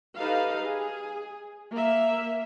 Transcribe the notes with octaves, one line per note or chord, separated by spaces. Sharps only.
D#4 G4 A4 B4 F5
G#4
A#3 E5